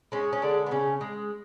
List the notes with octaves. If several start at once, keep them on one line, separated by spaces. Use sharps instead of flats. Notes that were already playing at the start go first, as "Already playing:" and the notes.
G#3 C#4
C#4
D3 G#3 D4
B3
C#3 C#4
G#3